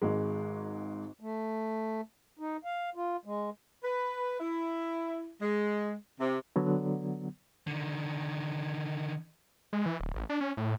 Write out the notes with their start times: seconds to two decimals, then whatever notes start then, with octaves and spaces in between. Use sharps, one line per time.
0.02 G#1 G#2 G#3
1.20 A3
2.39 D#4
2.65 F5
2.95 F4
3.25 G#3
3.84 B4
4.39 E4
5.41 G#3
6.20 C3
6.56 D3 F#3 B3
7.67 D3 D#3
9.73 G#3
9.86 E3
10.00 D1
10.15 A1
10.29 D4
10.41 C#4
10.57 A2